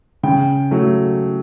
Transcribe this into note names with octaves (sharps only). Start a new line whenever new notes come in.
C#3 G5
F#3 A3